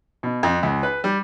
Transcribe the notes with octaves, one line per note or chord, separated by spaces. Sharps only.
B2
F2
C#2
B4
G3